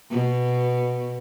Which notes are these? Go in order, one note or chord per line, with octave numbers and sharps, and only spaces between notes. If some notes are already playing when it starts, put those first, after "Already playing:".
B2